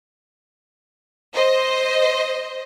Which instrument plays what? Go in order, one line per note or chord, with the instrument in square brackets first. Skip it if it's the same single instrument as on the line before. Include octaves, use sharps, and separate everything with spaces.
[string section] C5 D#5